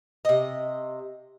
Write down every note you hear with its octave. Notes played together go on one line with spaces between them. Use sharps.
C3 D#5